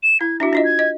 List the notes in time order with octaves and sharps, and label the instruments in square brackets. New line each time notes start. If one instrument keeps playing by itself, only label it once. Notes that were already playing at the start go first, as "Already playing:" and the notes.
[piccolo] E7
[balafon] E4 [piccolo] G#6
[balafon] D4 E4 F#4 [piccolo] E5
[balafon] D4 F4 D#5
[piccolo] G#6
[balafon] D#5